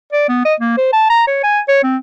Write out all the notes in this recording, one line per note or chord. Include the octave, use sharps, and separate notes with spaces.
D5
B3
D#5
A#3
C5
A5
A#5
C#5
G#5
C#5
C4